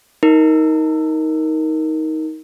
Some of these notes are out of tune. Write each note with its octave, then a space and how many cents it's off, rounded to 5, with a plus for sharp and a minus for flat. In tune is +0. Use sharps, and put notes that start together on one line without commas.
D#4 +20 A#4 +0